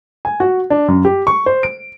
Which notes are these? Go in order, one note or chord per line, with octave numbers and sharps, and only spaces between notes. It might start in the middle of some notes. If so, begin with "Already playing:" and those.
G#5
F#4
D4
F#2
G4
C#6
C5
D7